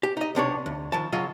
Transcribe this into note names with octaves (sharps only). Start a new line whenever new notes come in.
G4
D#4 D#5
B1 C3 D4 C#5
D2
D#3 F3 A5
C#3 F#3 F4 D#5